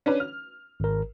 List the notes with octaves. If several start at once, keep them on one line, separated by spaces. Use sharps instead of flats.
C#4 D4 B4
F6
G#1 A#4